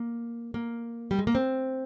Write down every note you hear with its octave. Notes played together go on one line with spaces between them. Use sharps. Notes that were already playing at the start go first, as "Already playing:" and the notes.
Already playing: A#3
A#3
G3
G#3
A#3
C4